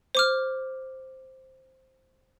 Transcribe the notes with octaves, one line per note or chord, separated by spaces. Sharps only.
C5 D6 F6